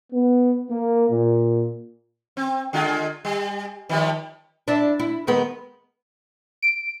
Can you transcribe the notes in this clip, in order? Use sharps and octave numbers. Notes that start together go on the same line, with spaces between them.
B3
A#3
A#2
C4
D3 G#3 F4
G3
D#3 F3 G3
D4 E4
E4
D#3 G#3 B3
D7